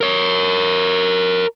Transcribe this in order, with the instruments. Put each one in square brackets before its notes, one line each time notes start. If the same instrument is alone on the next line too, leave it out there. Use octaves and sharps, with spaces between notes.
[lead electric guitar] A#4 C#5